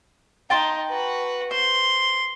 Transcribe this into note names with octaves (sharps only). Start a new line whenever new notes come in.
D#4 G5 A5 C6
F#4 B4
C5 C6